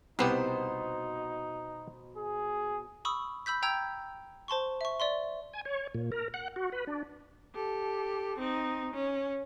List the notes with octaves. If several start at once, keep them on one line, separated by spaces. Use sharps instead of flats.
C2 B2 B3 D#4 G4 C5 F#5
G#4
B5 C#6 D#6 E6
B5 E6 G6 B6
G5 A#5 E6 G6 G#6
C5 A5 C6 C#6
E5 C#6
D5 E5 C6
G#5
C#5
A#2
A#4
F#5
F#4
B4
D4
G4 A4
C4 D#4
C#4